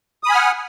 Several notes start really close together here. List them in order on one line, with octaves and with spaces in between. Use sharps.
D#6 B5 G#5 F6 F#5